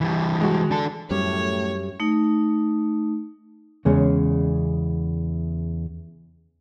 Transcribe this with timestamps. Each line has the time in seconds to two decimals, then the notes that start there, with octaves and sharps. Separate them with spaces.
0.01 E3 G3
0.41 G#3 F#4
0.71 D4 A4
1.11 F#2 A2 G3 C#5
2.00 A3 D#4
3.85 E2 C#3 G#3 C#4